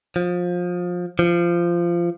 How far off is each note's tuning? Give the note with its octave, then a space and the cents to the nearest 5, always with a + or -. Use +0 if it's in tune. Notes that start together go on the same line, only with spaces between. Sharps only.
F3 +25
F3 -20